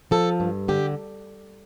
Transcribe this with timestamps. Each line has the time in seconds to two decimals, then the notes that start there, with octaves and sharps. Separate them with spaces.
0.11 F3 A4
0.40 G2
0.68 D3 G4